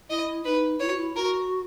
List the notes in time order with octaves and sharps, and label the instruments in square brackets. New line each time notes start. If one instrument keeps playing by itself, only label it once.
[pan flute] E4 [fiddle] D#5
[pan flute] D#4 [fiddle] B4
[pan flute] E4 [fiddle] C#5
[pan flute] F#4
E4
[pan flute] F#4 [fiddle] A#4